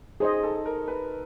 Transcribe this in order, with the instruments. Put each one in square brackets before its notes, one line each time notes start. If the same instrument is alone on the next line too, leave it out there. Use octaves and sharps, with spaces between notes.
[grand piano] D#4 [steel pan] G#4 C5 D#5
[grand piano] A4
A#4
B4